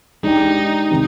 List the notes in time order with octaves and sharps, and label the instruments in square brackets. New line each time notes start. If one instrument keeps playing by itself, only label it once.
[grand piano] G#3 D4 G4 [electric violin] D#4
[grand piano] C3 D#3